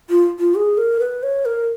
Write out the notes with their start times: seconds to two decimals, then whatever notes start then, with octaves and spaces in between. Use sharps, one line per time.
0.10 F4
0.39 F4
0.55 G#4
0.78 A#4
1.00 B4
1.23 C#5
1.45 A#4